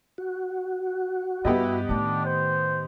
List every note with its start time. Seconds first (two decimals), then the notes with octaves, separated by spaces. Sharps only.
0.18 F#4
1.45 G2 B3 E4 G4 D#5
1.89 A2 D#3 D4
2.25 C5